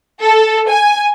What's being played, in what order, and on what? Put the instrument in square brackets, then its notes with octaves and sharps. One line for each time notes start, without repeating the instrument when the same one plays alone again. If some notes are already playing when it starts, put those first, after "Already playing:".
[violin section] A4
G#5